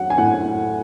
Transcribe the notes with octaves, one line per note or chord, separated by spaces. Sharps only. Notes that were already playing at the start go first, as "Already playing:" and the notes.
Already playing: F#3 F#5
G#5
A2 F#5